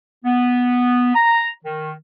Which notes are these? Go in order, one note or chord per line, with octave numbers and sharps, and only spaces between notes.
B3
A#5
D#3